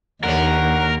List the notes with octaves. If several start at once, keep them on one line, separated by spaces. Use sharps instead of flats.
D#2 D3 D#3 A#4 C#5 F#5